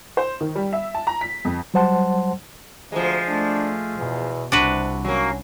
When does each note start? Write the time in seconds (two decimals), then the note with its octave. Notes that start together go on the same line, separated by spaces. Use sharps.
0.17 C5
0.40 D#3
0.55 G3
0.73 E5
0.95 A5
1.07 A#5
1.21 B6
1.45 F2
1.74 F#3 G3 C5 F#5 A5 C6
2.92 D2 F3 G#3
3.28 A3 D4
3.99 E2 B2
4.52 C2 C3 D4 F#4 B4
5.05 F#3 A#3 C#4